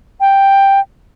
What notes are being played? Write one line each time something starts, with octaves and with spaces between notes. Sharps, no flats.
G5